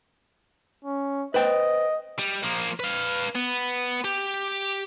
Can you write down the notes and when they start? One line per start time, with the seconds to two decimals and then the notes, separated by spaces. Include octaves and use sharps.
0.85 C#4
1.34 B4 C5 D#5 G5
2.19 G3
2.44 F3 A#3
2.80 B4 F5
3.35 B3
4.04 G4